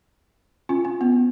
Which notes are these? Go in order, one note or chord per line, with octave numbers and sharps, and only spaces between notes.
C#4 F4
C#4
B3